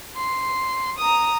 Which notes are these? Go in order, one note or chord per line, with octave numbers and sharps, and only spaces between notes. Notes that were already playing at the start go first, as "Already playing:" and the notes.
C6
A#5 D#6